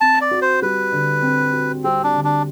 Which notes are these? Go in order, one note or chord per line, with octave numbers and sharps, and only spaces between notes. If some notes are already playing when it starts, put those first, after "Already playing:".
C4 A5
D5
F#4
C5
G3 B4
D3
C4
F#4
G3 C4
D4
D3
D4